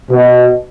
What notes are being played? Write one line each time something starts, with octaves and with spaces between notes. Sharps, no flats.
B2